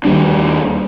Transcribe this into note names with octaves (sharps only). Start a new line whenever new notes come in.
D#2 G3 D4